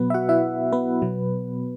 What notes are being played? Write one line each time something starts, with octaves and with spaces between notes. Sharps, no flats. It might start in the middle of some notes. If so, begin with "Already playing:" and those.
Already playing: B2 F#3 B3 B4
E5
F#4 F#5
E4 E5
B3 B4
B2 F#3